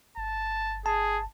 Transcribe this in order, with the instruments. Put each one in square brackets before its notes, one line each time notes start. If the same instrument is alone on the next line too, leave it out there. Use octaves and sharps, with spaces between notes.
[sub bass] G1 [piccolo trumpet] A5
[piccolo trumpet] G#4 [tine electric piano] A5